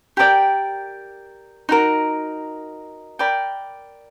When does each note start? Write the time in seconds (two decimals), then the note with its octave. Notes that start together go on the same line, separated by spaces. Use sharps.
0.17 G4 A#4 D5 G5
1.69 D#4 F#4 A#4
3.19 A#4 D5 G5 B5